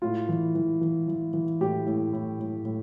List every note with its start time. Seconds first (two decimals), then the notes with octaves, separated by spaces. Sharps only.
0.02 A2 F4
0.29 E3
0.55 E3
0.81 E3
1.08 E3
1.33 E3
1.61 A2 G4
1.86 A2
2.13 A2
2.40 A2
2.65 A2